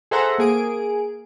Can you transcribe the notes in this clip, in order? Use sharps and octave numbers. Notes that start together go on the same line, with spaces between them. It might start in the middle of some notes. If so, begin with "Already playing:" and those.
G#4 A4 C5 E5 F#5 A#5
A#3 G#4 D7